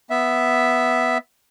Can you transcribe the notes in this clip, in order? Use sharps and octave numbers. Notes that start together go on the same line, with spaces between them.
B3 E5